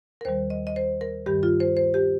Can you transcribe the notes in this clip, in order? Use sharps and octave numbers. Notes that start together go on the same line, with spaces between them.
A#4
D#2 D#3 G3 C5
D#5
D#5
C5
A#4
G2 D#3 G3 G4
F4
C5
C5
G4